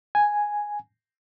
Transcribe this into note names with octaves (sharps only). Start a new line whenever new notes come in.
G#5